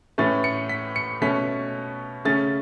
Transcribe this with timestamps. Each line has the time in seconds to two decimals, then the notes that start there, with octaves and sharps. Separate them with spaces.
0.18 A2 E3 A3 C#4 A6
0.44 C#7
0.69 B6
0.96 C#7
1.21 B2 A3 C#4 B6
2.25 C#3 A3 C#4 A6